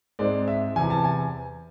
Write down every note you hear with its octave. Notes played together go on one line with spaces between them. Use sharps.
G#2 G#3 C4 D5
E5
E2 C3 E3 G#5
A5
G#5